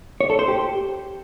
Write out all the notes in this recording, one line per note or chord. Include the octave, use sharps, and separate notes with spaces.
C#5
A4
C5
G4